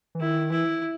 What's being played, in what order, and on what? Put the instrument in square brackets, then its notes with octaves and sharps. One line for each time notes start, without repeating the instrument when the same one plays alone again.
[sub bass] E3
[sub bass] D#3 [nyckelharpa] E4
[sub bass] E3 [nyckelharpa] E4